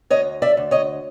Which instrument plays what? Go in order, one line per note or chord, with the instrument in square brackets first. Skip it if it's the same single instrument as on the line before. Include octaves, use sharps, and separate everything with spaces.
[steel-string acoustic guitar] D2 C#5 D#5
D5 E5
D2
C#5 D#5